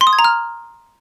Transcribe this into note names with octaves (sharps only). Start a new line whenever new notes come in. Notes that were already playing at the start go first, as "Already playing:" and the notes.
C6
D#6
G#6
A#5
F6